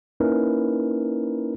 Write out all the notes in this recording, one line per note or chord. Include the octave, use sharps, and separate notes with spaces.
A#3 C#4 D#4 E4 A#4 B4